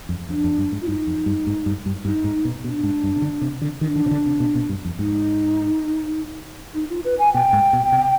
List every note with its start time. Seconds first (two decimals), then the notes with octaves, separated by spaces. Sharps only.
0.09 F2
0.28 F2 D4
0.44 F2
0.58 G2
0.72 G#2
0.82 F4
0.87 G2 D#4
1.07 F2
1.26 G2
1.47 G#2
1.66 G2
1.86 G2
2.05 G2 D#4
2.24 G#2
2.45 B2
2.64 B2 D4
2.83 G#2
3.04 G2
3.16 C3
3.22 D3
3.41 C3
3.62 D3
3.81 D#3 D4
3.96 D#3
4.06 C3
4.11 D3
4.26 C3
4.40 B2
4.55 B2
4.69 G2
4.85 F2
4.99 G#2 D#4
6.74 D#4
6.90 F4
7.05 B4
7.19 G#5
7.33 B2 G5
7.53 G#2
7.73 B2
7.92 C3